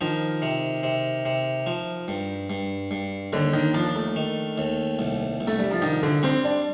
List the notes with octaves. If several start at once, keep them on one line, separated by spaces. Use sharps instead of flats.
D#3 F3
C3
C3
C3
F3
G2
G2
G2
D#2 D3
D#3
F3 D4
A3
D#3
D#2
C2
C2
A3
G3
F3
C2 D#3
D3
G3 C4
D4